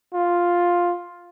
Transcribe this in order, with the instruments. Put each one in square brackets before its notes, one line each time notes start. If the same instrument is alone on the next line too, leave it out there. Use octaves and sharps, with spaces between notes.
[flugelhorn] F4